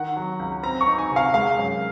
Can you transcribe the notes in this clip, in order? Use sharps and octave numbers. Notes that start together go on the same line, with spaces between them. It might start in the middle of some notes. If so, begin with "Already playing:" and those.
Already playing: D#3 F#5
F#3
C#2
C4 A#5
C#6
D#4
G#5
C3
F5
G#3 F5
F#2